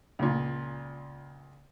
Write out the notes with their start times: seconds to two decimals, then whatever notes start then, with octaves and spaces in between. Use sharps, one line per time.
0.19 C#2 A#2